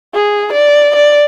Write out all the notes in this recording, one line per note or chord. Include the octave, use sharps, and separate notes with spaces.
G#4
D5
D5